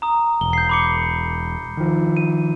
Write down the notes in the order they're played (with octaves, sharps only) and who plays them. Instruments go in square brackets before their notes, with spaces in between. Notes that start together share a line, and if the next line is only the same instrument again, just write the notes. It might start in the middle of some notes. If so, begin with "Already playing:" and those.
[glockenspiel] A#5 D#6
[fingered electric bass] E1 [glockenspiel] G7
[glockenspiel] G6 C7
B5 D6 C#7
[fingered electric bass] D#3 F3
[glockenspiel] D#7